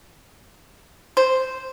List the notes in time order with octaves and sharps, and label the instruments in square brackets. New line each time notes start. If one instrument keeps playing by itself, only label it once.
[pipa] C5